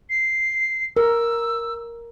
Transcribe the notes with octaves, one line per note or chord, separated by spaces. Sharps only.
C7
A#4 E6